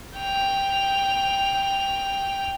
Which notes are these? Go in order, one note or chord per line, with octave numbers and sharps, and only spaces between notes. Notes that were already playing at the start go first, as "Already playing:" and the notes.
G5 F7